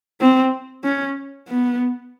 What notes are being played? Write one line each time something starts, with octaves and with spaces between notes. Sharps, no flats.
C4
C#4
B3